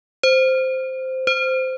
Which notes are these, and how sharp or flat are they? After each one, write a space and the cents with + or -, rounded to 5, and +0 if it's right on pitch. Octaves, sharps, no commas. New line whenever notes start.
C5 -5
C5 -15